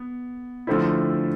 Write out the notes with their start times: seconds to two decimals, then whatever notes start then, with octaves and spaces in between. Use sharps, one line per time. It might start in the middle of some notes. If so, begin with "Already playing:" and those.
Already playing: B3
0.67 D3 F3 A3 C4 E4